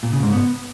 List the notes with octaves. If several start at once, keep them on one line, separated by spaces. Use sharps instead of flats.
A#2
C#3
G#2
B3